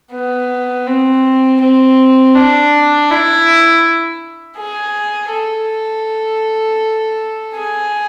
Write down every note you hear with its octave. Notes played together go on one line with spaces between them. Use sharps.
B3
C4
C4
D4
E4
G#4
A4
G#4